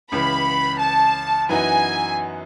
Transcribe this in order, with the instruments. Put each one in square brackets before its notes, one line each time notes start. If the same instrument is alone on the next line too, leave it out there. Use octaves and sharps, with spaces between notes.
[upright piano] C#2 C#3 E3 [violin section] B5
[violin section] A5
[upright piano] F#2 E3 B3 D#4 F#4 [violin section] G#5